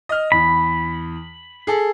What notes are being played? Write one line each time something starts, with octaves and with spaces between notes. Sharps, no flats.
D#5 F6
E2 B5
G#4 A4